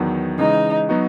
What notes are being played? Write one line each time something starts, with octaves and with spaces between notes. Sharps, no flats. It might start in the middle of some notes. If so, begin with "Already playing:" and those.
Already playing: E2 D#3 F#3 B3
C#3 E3 G#3 D#4
F#3 B3 D#4 F#4